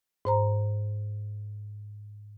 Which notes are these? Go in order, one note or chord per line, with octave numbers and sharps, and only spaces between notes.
G#2 C5 A#5